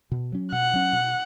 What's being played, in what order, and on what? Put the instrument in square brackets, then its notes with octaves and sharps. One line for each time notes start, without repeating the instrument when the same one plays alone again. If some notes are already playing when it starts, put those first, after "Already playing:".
[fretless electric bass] B2
F#3 C#4
[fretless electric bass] B2 [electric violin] F#5
[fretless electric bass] F#3 C#4
B2